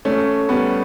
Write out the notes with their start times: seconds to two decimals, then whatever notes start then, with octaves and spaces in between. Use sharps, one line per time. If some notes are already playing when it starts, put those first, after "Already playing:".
0.05 A3 C#4
0.49 G3 B3